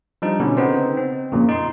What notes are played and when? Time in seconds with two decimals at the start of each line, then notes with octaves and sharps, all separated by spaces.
0.22 F3 G3 D4 D#4
0.40 B2 D3 C#4
0.57 C#3 B3 C4 D#4 C5
0.97 C4
1.32 F2 A#2 C#3
1.49 D#4 C6